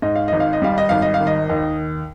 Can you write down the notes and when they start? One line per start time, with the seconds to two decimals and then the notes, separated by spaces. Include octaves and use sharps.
0.02 G#2 D#5
0.15 F5
0.28 G#1 D#5
0.40 F5
0.53 D#5
0.62 G3 F5
0.78 D#5
0.89 G#1 F5
1.02 D#5
1.14 F5
1.20 D#3
1.27 D#5
1.49 D#2